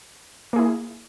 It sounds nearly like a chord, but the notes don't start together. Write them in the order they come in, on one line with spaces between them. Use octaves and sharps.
A#3 G#4 E4